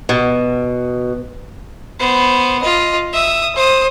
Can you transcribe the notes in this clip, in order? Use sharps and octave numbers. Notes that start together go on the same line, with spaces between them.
B2
B3 C5
F4 D#5
E5 D#6
C5 D#6